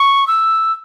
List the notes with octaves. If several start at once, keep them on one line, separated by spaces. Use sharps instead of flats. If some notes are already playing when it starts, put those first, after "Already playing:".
Already playing: C#6
E6